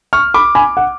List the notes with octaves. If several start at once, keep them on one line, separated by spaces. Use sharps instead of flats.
C#6 F6
B5 D6
G#5 B5
F#5